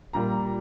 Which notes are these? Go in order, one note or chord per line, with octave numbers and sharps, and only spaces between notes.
A#2 G3 A#3 A#5